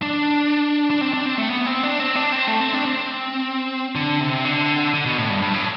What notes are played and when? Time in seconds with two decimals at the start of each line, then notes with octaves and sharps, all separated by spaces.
0.02 D4
0.91 D4
1.01 C4
1.13 D4
1.25 C4
1.38 A3
1.50 B3
1.66 C4
1.83 D4
2.00 C4
2.16 D4
2.32 C4
2.48 A3
2.60 C4
2.73 D4
2.85 C4
3.95 D3
4.20 C3
4.45 D3
4.94 D3
5.06 B2
5.18 A2
5.30 G2
5.42 G2
5.54 A2